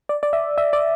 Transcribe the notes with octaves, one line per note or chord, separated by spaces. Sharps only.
D5
D5
E5
E5
D5